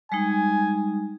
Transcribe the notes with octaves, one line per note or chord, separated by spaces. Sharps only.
G3 G#3 D#4 G#5